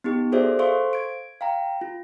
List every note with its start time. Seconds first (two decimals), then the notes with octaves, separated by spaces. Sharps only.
0.04 B3 D#4 G4
0.32 F#4 G#4 A4 C5 D5 E5
0.59 A4 C5 F5 C6 C#6
0.93 G#6 D7
1.41 F5 G5 A#5
1.81 F4